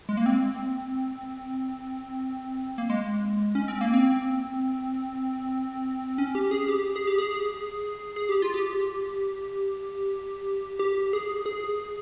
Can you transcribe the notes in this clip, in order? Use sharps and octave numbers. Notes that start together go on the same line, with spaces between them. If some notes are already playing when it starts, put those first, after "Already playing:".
G#3
A#3
C4
A#3
G#3
C#4
C4
A#3
C4
C#4
G4
G#4
G4
G#4
G4
G#4
G#4
G4
F4
G4
G4
G#4
G#4